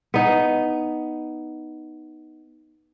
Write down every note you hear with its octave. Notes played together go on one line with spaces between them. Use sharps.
B3 D#4